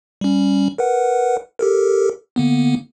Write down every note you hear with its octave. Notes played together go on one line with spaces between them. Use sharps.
G3 C#4
A#4 B4 F#5
G4 A4 A#4
D3 A#3 B3